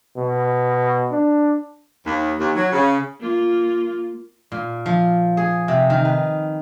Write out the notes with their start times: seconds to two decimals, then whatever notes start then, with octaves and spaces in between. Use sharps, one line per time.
0.17 B2
1.11 D4
2.05 D#2
2.39 D#2
2.56 F#3
2.71 C#3
3.20 A#3 F4
4.52 A#2
4.86 F3
5.37 G#4
5.68 C3
5.90 D#3
6.05 B4